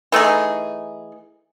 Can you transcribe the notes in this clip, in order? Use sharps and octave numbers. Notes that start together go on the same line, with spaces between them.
E3 A3 D#4 G#4